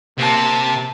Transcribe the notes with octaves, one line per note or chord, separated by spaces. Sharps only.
C3 A#3 A5